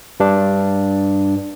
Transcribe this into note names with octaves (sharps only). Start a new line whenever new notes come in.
G2 D4